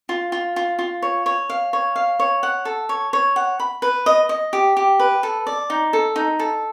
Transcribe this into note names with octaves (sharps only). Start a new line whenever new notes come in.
F4
F4
F4
F4
C#5
C#5
F5
C#5
F5
C#5
F#5
A4
C#5
C#5
F#5
B5
B4
D#5
D#5
G4
G4
B4
A4
D5
D#4
A4
D#4
A4